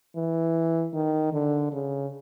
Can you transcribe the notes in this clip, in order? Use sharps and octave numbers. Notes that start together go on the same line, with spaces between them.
E3
D#3
D3
C#3